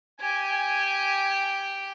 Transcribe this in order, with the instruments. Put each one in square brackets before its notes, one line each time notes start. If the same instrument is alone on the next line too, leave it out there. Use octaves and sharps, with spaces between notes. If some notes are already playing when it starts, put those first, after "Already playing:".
[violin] G4 [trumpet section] G#5